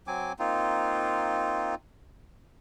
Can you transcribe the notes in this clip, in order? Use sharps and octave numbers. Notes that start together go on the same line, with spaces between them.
F#3 C4 G#5 D6
A#3 C4 D#4 F4